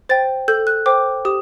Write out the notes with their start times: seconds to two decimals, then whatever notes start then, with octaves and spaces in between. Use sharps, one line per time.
0.09 C5 G5 A6
0.48 A4 G6
0.67 F#6
0.86 C5 G5 D6
1.25 G4 D#6